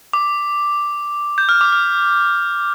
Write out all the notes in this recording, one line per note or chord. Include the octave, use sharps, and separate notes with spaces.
D6
G6
F6
D6
F6